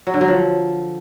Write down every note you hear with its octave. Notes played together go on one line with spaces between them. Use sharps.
F#3
D3
F#3
F3